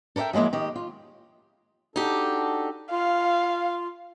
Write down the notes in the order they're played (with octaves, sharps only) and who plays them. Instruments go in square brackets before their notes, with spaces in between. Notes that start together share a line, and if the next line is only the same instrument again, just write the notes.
[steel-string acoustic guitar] A4 A#4 C#5 E5 G5
F3 F#3 G#3 A#3 E4
D#3 G4 D#5
F4
[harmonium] D4 F#4 A4 [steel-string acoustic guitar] D#4 G4
[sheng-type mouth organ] F4 [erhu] F5